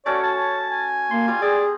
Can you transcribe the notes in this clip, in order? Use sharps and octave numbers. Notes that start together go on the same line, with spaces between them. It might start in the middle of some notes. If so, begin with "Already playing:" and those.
A3 C#4 F#4 C#5 D5
A5
G#5
A#3 C6
G3 F4 C6
C4 G#4 D5